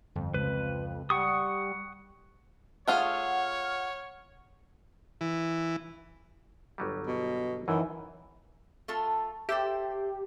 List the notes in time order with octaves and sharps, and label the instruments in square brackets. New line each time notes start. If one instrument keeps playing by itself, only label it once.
[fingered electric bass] G1 [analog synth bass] F2
[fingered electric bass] C#2 [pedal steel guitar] B4
[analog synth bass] G3 [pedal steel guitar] F#5 C#6 D#6
[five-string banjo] A3 F4 G#4 [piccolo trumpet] C#5 [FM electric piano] F#5 F6
[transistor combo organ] E3
[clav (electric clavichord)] G1 F#3 G3
[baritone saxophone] B2
[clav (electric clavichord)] F#2 [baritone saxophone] D#3 [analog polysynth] E3
[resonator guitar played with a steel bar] A3 F4 A4
[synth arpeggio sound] G4 [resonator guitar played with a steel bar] A4 C5 E5